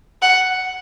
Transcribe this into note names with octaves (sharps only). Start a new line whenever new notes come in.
F#5